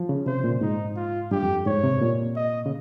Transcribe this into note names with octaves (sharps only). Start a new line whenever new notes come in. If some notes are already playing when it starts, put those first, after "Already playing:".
Already playing: F3
C#3
C3 C5
A#2
G#2 D#4
F4
G2 G4
F2
G#2 C#5
C3
A#2
D#5
C#3